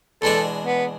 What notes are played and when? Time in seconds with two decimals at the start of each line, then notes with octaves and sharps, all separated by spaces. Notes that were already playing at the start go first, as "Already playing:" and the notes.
0.22 E2 B2 G#3 D4 A4
0.66 B3